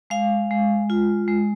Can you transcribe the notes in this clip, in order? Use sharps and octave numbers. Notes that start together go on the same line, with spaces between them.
G#3 F5
G#3
F4
G#3